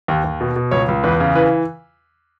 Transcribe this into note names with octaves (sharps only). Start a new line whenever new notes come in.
D#2
D#2
B2
B2
C#2 C#5
C#2
E2 B4
C#3
E3 B4